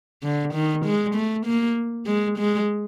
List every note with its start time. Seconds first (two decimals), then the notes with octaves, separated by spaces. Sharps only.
0.23 D3
0.54 D#3
0.85 G#3
1.15 A3
1.46 A#3
2.06 G#3
2.38 G#3